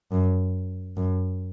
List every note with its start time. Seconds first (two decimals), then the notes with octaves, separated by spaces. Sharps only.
0.12 F#2
0.97 F#2